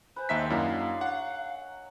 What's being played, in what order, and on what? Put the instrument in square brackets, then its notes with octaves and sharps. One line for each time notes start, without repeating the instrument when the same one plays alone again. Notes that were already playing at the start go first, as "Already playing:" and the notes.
[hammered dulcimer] B4 G#5 [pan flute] C5
[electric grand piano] D#2 E5 B6 [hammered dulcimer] D#3 G#3 A#5
[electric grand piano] F#2 A#3 E4 [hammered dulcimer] F#3 D4 [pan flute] F5
[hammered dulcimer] C#5 [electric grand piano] F#5